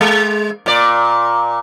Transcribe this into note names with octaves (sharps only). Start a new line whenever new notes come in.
G#3
A#2 D5